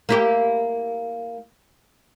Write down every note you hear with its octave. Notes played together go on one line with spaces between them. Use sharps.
A#3 E4 G4